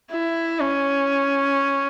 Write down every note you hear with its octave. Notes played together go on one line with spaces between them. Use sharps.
E4
C#4